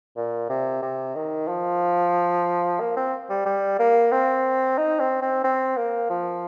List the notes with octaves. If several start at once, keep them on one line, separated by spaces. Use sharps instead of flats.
A#2
C3
C3
D#3
F3
A#3
C4
G3
G3
A#3
C4
D#4
C4
C4
C4
A#3
F3